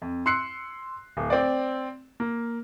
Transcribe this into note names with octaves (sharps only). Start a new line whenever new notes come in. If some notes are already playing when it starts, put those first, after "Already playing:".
F2
C6 E6 F#6 C7 C#7
D1
C4 D5
A#3